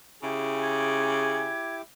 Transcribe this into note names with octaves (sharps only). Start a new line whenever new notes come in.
C#3 E4 G4 G#4 D6
G#6